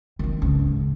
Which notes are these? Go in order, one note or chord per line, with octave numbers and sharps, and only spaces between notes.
D#3 C4
C#2
G#2